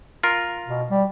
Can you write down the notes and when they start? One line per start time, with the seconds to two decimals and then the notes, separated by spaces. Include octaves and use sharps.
0.23 F4 A#4
0.67 B2
0.90 G3